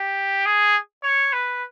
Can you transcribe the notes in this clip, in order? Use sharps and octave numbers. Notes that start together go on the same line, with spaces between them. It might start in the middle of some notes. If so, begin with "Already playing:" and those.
Already playing: G4
G#4
C#5
B4